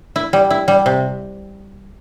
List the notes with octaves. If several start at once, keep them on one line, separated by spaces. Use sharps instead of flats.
E4
G3
E4
G3
C3